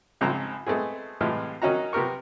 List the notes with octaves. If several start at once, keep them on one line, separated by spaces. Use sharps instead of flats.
A#1 G#2 C#3 F3 C4 A#5
G#3 A3 B3 C4 G#4
A2 C3 E3 G#3 A3 F4
D#3 F#3 C#4 D#4 F#4 A#5
C3 B3 G4 A#4 C#6